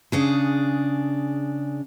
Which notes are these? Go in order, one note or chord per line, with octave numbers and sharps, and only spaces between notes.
C#3 D4 G#4